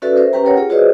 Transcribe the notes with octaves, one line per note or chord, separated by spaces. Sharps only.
C#4 F#4 A4 B4 D5 E5
A#4 C5 E5
C#4 G4 B4 G5 A#5
G4 A#4 C#5 F#5
F4 G#4 C#5
F#4 G#4 B4 C5 D5 D#5